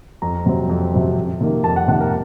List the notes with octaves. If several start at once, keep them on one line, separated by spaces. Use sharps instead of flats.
F2 A#5
C3 F#3 C4
F2
C3 F#3 C4
F2
C3 D#3 A#3
F2 A5
F#5
C3 D#3 A#3 F#5
A#4